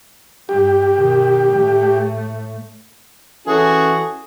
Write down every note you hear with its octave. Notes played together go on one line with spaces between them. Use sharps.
G2 G4
B2 D#3
A2 A3
E3 C#4 F#4 G#4 A4